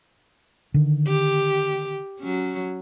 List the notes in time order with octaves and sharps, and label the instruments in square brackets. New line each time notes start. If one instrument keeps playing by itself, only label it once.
[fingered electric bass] D3 D#3
[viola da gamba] G4
F#3 C#4